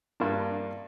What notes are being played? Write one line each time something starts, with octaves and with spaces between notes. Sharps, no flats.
G2 A#3 D4